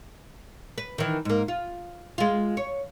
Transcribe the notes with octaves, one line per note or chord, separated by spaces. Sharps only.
B4
D#3 E3
G#2 A#3
F4
G#3 F4
C#5